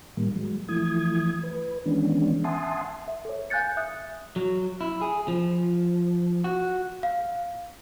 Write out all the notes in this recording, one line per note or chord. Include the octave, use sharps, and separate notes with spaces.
A2 D#3 G3 A#3
F#3 G#3
E3 F3 A3 E4 D#6 G#6
B4
D#3 E3 G#3 B3 C#4 D4
E5 F#5 G#5 A5 C6 D#6
E5
A4 C#5
F5 G#5 F#6 G6 A6 C#7
E5 D#6 F#6
F#3
E4
G#4
F3
F#4
F5